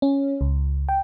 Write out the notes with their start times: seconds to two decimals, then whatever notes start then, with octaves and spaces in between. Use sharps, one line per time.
0.02 C#4
0.41 C#2
0.89 G5